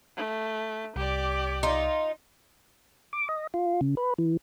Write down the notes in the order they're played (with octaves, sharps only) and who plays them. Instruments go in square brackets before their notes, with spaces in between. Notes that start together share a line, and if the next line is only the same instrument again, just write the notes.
[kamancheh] A3
[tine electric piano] C2 [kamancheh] G4 D5
[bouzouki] D#4 F4
[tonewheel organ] D6
D#5
F4
C#3
B4
E3